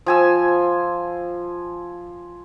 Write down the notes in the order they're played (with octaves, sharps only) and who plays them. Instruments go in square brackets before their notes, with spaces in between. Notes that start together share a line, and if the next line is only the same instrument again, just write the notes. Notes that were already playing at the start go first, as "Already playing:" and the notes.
[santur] F3 G#5 E6